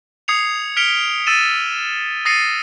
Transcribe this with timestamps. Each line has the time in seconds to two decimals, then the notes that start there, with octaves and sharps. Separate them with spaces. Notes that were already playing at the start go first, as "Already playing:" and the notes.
0.28 D#6 G#6 C7 C#7 F7
0.77 F6 B6 C#7 D7 F7 G7
1.27 E6 A6 D#7 E7
2.25 D#6 A6 A#6 C7 C#7 D#7